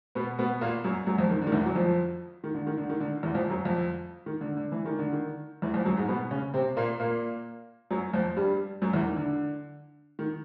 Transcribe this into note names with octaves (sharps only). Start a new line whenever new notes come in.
B2 B3
B2 B3
A#2 A#3
F#2 F#3
F#2 F#3
F2 F3
D#3
D3
D#3
E2 E3
F#3
F2 F3
D#3
D3
D#3
D3
D#3
D3
E2 E3
F2 F3
F#2 F#3
F2 F3
D#3
D3
D3
E3
D#3
D3
D#3
E2 E3
F2 F3
F#2 F#3
G#2 G#3
B2 B3
C#3 C#4
C3 C4
A#2 A#3
A#2 A#3
F#2 F#3
F2 F3
G2 G3
F#2 F#3
E2 E3
D#3
D3
D#3